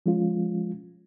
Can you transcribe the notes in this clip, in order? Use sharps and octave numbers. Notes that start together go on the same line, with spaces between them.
F3 G#3 C#4 F4